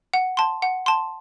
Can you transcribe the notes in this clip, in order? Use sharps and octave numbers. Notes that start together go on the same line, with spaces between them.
F#5
A5 C6
F#5
A5 C6